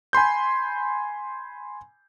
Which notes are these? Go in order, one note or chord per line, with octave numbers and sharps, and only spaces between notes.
G#5 B5 C6 G6